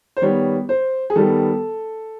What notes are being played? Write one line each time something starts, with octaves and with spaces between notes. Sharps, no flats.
C5
D#3 G3 B3 C#5
C5
G#4
D#3 G3 B3 A4